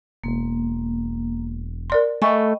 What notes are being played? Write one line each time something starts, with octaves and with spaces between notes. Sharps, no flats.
E1 A#3
A#4 D5 C6
A3 D#5 G5 G#5 B5 C#6